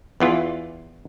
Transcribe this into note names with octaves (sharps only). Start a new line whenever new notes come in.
E2 E3 F4